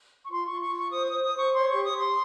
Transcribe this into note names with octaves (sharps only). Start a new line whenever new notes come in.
C#6
F4 C6
F4 C#6
C#6
F4
C#6
C5 D#6
C5 D#6
D#6
C5 C#6
C#5 C6
G4 C#6
D#6
G4
C6